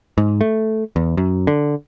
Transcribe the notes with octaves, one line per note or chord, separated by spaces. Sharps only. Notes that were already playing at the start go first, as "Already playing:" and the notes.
G#2
A3
E2
F#2
D3